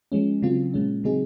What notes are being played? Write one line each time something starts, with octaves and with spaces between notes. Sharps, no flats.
F3 G#3 C#4
C#3 F#3 C4 F4
A#2 G#3 C#4
C#3 F#3 C4 D#4 G#4